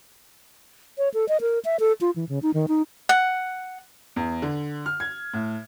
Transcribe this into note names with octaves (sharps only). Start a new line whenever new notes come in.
C#5
A4
D#5
A#4
E5
A4
F4
E3
C#3
D#4
D#3
D#4
F#5
E2
D3
F6
G#6
A2